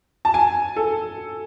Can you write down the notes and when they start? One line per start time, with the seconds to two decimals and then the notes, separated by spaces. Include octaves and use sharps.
0.25 A5
0.34 G#5
0.76 A4